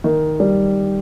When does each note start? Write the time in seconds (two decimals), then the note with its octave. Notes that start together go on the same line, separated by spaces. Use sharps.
0.04 D#3
0.40 G3